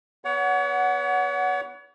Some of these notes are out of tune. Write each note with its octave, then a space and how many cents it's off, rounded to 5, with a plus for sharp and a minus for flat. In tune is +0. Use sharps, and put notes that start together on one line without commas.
B3 -10 C#5 +40 F#5 +0